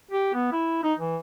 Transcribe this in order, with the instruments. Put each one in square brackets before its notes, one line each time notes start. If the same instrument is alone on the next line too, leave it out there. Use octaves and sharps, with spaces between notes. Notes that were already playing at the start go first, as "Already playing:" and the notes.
[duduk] G4
B3
E4
D#4
E3